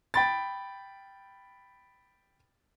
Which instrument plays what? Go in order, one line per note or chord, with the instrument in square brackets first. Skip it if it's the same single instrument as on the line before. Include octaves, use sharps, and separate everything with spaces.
[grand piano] G5 B5 A6